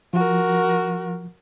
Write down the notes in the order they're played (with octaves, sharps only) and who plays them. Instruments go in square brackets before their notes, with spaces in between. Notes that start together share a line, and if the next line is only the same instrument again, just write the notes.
[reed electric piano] F3 [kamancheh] F#4 A#4